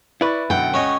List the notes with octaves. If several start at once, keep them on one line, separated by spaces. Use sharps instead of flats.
E4 B4 D5 C#6 A6
F#2 B2 D3 F#5 G5
C#2 C#4 C#5 D#5